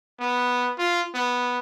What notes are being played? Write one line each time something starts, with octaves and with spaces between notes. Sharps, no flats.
B3
F4
B3